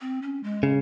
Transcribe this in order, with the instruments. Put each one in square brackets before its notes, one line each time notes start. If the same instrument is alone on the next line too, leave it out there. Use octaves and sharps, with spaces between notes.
[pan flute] C4
C#4
G#3
[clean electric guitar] C#3